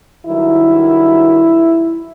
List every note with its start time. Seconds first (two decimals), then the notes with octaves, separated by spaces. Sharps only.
0.25 G2 D#3 F#3 E4